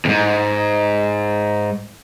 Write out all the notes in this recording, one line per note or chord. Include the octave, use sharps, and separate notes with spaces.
E2 G#2